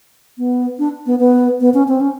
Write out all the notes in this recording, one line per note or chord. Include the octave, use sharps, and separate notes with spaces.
B3
D4
B3
B3
B3
C#4
C4
C#4